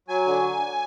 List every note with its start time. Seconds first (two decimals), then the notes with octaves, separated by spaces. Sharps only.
0.08 F#3 G#5
0.26 D3